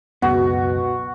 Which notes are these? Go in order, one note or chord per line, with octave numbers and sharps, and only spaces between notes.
C#2 F#2 B2 B3 F#4